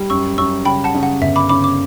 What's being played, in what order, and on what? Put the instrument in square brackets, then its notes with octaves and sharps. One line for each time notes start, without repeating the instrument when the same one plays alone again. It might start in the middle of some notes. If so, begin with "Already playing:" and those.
Already playing: [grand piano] G3
[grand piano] F#2 [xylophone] C#6 E6
[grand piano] F#2 [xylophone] C#6 E6
[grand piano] C#3 [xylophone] G5 B5
[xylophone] F#5 A5
[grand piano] C#3
[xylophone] F#5
[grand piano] G1 [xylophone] E5
[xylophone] B5 D6
[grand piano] C#3 [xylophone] B5 D6
[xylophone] D6